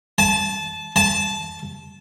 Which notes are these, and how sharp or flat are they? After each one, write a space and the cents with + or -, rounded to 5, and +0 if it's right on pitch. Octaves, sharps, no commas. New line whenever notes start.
A5 -20
A5 -15